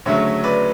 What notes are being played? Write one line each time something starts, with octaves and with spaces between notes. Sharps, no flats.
D2 C#3 F#3 A3 C#5 E5
B4 D5